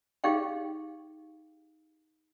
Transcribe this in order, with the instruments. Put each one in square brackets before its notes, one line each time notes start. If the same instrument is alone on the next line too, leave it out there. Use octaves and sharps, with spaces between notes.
[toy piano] D#4 G4 G#4 F5 G5